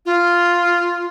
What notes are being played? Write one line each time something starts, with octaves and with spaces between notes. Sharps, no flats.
F4